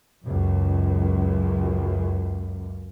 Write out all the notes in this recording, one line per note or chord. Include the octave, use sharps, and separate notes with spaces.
C#2 F#2